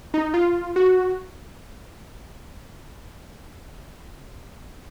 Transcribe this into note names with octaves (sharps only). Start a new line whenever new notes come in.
D#4
F4
F#4